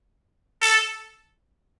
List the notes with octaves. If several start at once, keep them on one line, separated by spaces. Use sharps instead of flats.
A4